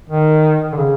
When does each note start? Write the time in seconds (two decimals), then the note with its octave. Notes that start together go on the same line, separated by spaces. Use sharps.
0.09 D#3
0.72 D3
0.77 C#3